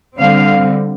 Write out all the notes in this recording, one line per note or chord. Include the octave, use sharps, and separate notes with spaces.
D3 G3 C4 F5